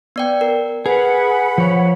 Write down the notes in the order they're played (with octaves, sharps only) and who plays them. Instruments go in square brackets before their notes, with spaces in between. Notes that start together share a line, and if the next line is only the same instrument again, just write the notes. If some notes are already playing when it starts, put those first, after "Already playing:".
[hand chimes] B3 D5 G5
A#4
[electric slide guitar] G#4 [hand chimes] B4 G#5 [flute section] F#5 B5
[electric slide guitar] F3 C#5